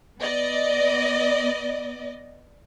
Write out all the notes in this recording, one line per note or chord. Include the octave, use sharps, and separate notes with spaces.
B3 D5 D#5